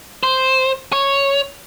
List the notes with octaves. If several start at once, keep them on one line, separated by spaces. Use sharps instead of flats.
C5
C#5